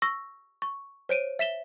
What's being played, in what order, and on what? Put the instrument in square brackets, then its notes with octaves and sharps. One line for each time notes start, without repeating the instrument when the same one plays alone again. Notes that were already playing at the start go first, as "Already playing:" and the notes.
[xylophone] C#6 E6 A#6
C#6
C5 C#5 D7 D#7
E5 B6 E7 G7